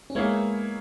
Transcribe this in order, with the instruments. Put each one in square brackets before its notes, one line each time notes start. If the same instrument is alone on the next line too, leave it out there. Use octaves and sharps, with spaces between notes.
[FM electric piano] C#4
[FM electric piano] G#3 B3 [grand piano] A#3 E4 G#4 C#5